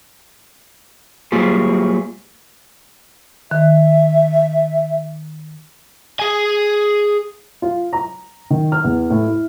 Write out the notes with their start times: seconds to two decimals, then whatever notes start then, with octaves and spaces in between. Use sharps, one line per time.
1.32 F#3 G3 A#3 F4 G4 G#4
3.51 D#3 E5
6.20 G#4 G#5
7.62 F4
7.93 A#5
8.50 D#3
8.72 F6
8.84 E2
9.10 A2
9.28 E4